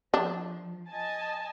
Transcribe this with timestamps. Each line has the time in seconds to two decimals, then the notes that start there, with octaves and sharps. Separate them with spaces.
0.14 F3 D4
0.91 D#5 G#5 A5